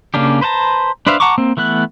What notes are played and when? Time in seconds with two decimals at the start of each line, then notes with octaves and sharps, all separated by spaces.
0.14 C#3 A#3 C#4 D4 G4
0.41 B4 C5 F#5 A5 A#5
1.07 D4 B4 C5 E5 F5
1.20 F#5 A5 A#5 C#6 D6
1.38 A#3 C4
1.57 E3 A3 B3 F#6